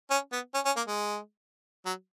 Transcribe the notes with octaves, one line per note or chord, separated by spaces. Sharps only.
C#4
B3
C#4
C#4
A#3
G#3
F#3